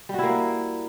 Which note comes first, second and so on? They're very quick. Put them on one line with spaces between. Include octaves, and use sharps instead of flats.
G3 F#4 E4 A#3